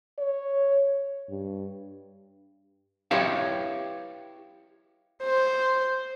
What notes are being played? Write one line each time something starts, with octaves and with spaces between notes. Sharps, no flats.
C#5
G2
E4 G4 B4 C#5 E5 F5
C5